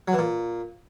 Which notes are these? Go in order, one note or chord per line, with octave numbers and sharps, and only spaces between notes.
F#3
E3
A#2